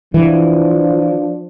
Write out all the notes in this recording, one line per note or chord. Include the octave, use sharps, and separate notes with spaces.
E3 F3 D4